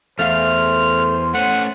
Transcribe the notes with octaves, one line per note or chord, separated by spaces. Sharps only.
E2 A3 C5 F5 F6
A3 C#4 F#5